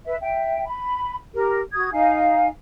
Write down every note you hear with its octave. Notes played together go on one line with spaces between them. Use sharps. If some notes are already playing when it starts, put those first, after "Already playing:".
B4 E5
E5 G5
B5
G4 A#4
F#4 D#6 G#6
D#4 F5 G#5